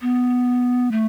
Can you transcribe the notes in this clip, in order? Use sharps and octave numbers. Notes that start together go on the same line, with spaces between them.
B3
A3